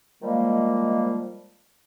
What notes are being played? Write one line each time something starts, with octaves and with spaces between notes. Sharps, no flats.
D#3 F3 G3 G#3 A#3